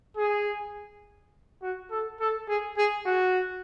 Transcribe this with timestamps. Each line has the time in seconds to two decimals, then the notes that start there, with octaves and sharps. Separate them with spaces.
0.17 G#4
1.62 F#4
1.91 A4
2.20 A4
2.48 G#4
2.77 G#4
3.06 F#4